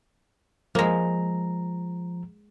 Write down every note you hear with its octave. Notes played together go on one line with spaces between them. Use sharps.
F3 G#3 A#3 A#5